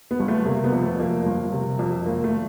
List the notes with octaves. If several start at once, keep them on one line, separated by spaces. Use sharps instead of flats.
B3
G1
A3
C3 A#3
B3
F2
A3
F2 A#3
G1
C3
F2
G#1 A#3
A3